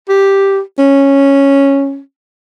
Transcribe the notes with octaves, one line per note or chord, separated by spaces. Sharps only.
G4
C#4